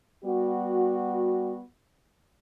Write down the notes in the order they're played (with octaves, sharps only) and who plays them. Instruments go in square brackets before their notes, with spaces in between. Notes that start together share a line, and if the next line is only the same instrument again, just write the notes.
[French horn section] G3 B3 F#4